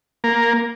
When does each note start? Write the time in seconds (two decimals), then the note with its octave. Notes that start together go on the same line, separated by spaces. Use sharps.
0.24 A#3